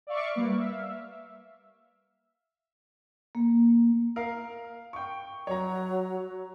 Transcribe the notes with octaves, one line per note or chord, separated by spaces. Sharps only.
D5 E5 F5 C#6 D6
G3 A#3 B4
E5 F5
A#3
A#4 F5
G5 C#6
F#3 C#5 A#5